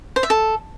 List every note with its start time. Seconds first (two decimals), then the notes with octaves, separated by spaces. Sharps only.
0.16 C5
0.23 E5
0.30 A4